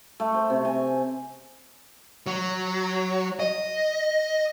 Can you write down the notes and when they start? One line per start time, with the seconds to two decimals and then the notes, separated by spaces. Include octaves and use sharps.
0.20 A3
0.34 C5
0.50 C3
0.65 G#5
2.27 F#3
3.40 D#5